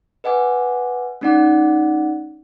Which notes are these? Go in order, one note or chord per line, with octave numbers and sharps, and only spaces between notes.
B4 D#5 F#5 G#5 D6
A3 C#4 D#4 D5 F#5 D6